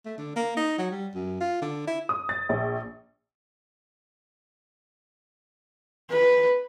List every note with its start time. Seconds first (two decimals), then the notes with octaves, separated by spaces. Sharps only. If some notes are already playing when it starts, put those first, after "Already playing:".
0.05 A3
0.18 D3
0.36 A#3
0.57 D#4
0.78 F#3
0.91 G3
1.15 F#2
1.41 F4
1.62 D3
1.87 E4
2.09 D#6
2.29 A6
2.49 A#1
6.11 B4